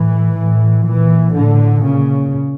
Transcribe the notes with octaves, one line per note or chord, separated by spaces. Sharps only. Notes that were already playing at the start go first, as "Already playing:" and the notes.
Already playing: A2 E3
A2
A#2 E3
A2 D3
A#2 C#3